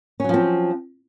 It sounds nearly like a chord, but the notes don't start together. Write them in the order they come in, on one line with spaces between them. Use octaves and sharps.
C#4 F#3 F3 C4